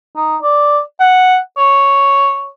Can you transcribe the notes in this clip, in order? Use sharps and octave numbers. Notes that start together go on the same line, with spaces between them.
D#4
D5
F#5
C#5